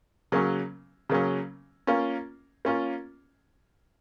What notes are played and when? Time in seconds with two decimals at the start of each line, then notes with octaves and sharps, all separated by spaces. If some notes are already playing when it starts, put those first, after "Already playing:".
0.32 C#3 F#3 A#3 C#4
1.09 C#3 F#3 A#3 C#4
1.87 A#3 C#4 F4
2.65 A#3 C#4 F4